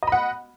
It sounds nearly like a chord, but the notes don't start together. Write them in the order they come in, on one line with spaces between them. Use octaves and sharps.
D#5 B5 F#5